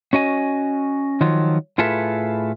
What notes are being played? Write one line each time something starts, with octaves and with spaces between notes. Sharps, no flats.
C#4 F#4 D#5 G#5
D#3 F3 F#3 F4
A2 F4 G#4 A4 B4 E5